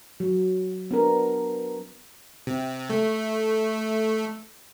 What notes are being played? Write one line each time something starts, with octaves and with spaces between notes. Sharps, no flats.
F#3
B3 D4 A#4
C3
A3